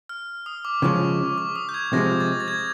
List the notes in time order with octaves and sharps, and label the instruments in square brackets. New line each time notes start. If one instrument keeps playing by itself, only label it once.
[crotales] F6
D#6
D6
[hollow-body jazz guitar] C#3 F3 G#3 [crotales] C#6
[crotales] D6
D#6
G6
G#6
[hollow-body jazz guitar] C3 F3 G#3 [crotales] A#6
[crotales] A6
A6
G#6